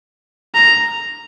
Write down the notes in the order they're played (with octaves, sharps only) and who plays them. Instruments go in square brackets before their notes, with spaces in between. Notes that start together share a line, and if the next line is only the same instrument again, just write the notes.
[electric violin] A#5